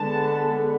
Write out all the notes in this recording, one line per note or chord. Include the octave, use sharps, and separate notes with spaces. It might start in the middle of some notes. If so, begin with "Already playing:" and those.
Already playing: D3 G#3 B3 A5